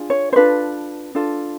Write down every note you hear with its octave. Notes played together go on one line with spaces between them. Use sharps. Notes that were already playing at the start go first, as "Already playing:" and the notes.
Already playing: D4 F4 G#4
C#5
C5
D4 F4 A4 B4
D4 F4 A4